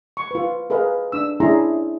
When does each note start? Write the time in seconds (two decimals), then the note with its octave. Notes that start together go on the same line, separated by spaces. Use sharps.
0.17 C#6
0.31 F4 B4
0.70 G#4 A#4 B4 D#5 F5
1.12 D4 E6
1.40 C#4 D4 E4 G#4 A#5 C6